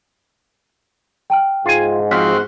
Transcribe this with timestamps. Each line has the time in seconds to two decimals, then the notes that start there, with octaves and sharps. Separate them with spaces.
1.30 G5 A5 F6
1.66 G#2 F4 G#5
2.11 F3 C4 F#4 C5 F6 B6